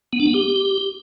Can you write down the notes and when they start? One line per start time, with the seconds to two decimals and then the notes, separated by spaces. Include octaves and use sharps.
0.13 B3
0.20 D4
0.27 B3
0.34 G4